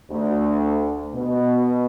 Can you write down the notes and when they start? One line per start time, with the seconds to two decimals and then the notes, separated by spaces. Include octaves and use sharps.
0.11 D2
1.15 B2